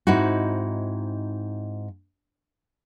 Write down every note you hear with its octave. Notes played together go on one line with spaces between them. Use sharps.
G#2 C4 D#4 E4 F#4